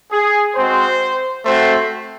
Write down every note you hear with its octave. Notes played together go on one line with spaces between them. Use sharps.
G#4
G#3 C4 F#4 C5
A3 C4 F#4 C5